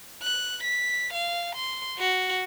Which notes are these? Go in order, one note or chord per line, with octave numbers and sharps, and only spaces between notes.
F#6
B6
F5
C6
F#4